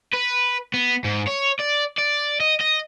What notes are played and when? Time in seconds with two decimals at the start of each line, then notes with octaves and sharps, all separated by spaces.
0.13 B4
0.74 B3
1.04 G#2
1.28 C#5
1.60 D5
1.98 D5
2.40 D#5
2.61 D#5